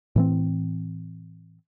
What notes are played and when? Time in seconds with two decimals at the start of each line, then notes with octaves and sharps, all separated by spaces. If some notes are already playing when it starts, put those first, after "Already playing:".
0.16 A2 E3 C4